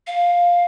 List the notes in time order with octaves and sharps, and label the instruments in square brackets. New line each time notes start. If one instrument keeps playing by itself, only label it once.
[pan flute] F5